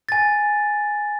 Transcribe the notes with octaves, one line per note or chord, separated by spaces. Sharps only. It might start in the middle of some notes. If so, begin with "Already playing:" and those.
G#5 A6